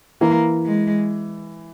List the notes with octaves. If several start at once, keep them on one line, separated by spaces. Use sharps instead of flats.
E3 A#3
G#3